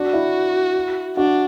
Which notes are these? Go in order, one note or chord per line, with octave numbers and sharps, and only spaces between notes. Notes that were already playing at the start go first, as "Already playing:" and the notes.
Already playing: D4 F#4
E4
D4 F#4